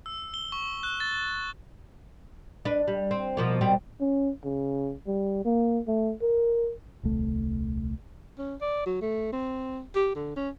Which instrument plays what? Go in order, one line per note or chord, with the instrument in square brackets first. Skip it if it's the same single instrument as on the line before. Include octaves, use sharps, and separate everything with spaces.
[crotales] E6
G7
C#6
F#6
A6
[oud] D4 B4
G3
C4
B2 F3 A#3
B2 G3 C4
[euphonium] C#4
C#3
G3
A#3
A3
A#4
[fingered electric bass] D#1 C2 A3
[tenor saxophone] C#4
D5
F#3
A3
C4
G4
D3
C#4